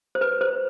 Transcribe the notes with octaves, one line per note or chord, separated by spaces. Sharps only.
C5
B4
C5